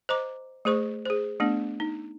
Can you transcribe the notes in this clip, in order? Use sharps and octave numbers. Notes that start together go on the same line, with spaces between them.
C5 D#5 A#5 D6
A3 G#4 C5 C#6
G#4 C5
A3 B3 D4
D#4